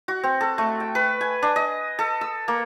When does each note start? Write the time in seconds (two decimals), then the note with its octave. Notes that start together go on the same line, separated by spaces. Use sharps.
0.08 F#4
0.23 C4
0.41 A4
0.58 A3
0.80 G5
0.95 B4
1.21 G#5
1.42 D4
1.56 D#5
1.99 A4
2.21 E6
2.48 A#3